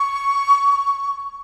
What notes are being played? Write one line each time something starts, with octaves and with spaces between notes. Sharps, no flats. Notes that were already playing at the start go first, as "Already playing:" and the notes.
Already playing: C#6